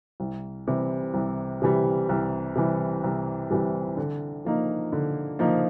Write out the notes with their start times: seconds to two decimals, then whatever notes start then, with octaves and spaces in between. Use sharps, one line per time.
0.20 C2
0.67 C3 E3 G3
1.14 C2
1.62 C3 E3 G3
2.09 C2
2.55 C3 E3 G3
3.04 C2
3.51 C3 E3 G3
3.97 D3
4.45 F3 A#3 D#4
4.92 D3
5.39 F3 A#3 D#4